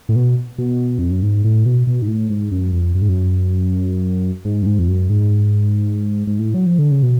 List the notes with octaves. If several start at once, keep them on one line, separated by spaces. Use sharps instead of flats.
A2
B2
B2
F2
F#2
G#2
A2
B2
B2
G#2
A2
G#2
F#2
F2
F#2
G#2
F#2
G#2
F#2
G#2
F2
F#2
G#2
G#2
A2
F#3
F3
D3
C#3
B2